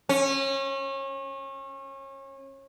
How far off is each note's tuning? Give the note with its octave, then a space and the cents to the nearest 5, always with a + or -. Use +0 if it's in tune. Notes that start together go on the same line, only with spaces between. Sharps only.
C#4 -30